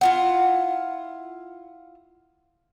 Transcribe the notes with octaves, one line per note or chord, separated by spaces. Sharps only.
E4 F4 F#5